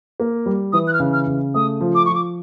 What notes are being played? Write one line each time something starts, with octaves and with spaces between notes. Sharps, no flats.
A#3
G3
E3 D#6
F#6
F6
C#3
F6
C#3
A3 D#6
F3
D6
F3 C#6
D6